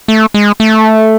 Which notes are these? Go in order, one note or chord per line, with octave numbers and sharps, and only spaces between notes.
A3
G#3
A3